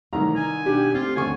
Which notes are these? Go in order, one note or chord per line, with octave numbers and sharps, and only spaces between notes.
C2 D#3 E3 F#3 A3 A#5
D#4 G#5
B2 D4 F#4 G4
A3 C4 F4
D#1 D2 G#5 C#6